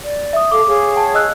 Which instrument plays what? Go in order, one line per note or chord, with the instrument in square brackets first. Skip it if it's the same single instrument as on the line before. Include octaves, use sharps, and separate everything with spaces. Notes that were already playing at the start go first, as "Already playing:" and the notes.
[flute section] D5
[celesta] E5 D#6
[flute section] A4 F5 [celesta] D6
[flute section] G#4 C#5 F5
[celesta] G5 A5
D#5 E6 F#6